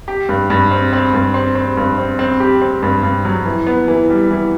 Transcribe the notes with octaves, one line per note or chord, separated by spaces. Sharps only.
G4
G2
G2
C4
C4
G2
C4
C4
G2
C4
C4
G4
C4
G2
G2
F#3
E3
B3
E3
G3
E3